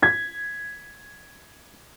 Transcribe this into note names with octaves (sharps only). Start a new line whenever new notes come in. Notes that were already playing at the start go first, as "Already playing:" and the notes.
G#6 B6